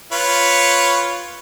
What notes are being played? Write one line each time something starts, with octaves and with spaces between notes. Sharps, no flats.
F4 B4 C#5